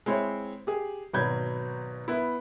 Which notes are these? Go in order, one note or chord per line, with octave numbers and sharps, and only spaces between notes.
G#3 C4 E4 C#5
G4 G#4
G#1 B2 F#3 B5 G6 G#6
B3 E4